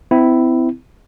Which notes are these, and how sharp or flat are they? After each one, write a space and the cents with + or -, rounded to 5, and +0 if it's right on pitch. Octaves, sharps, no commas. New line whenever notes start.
C4 -35 E4 +0